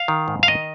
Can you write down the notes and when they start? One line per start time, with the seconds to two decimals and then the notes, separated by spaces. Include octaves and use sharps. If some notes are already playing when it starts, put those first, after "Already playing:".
Already playing: F5
0.08 D#3
0.28 G#2
0.43 F5
0.47 D#3 D#5